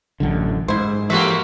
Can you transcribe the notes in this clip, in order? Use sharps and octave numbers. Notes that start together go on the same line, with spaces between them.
A1 F#2 D3
G#2 E4 C5
E3 A3 A#3 F#4 G4 E5